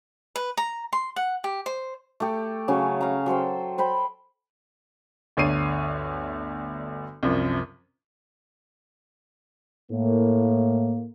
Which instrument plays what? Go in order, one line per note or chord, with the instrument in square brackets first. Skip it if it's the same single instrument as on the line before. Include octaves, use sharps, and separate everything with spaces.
[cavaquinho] B4
A#5
C6
F#5
G4
C5
[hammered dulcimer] A3 G4
C#3 F#3 C#4 F5
F5 A#5
F#3 A4 C5 G5
C5 G5 B5
[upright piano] G1 D2 D4 C#5 C7 D#7
C2 F#2 F3
[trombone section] A2 A#3